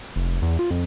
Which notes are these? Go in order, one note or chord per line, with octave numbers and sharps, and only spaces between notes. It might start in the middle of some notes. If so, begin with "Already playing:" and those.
F1
E2
F4
F2